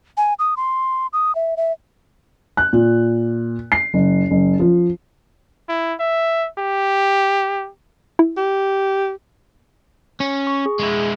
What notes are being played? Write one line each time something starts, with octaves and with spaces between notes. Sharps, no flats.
G#5
D#6
C6
D#6
E5
E5
F#6
A#2
C7
F#1
F#1
F3
E4
E5
G4
E4
G4
C#4
C#6
G#4
G#3 E4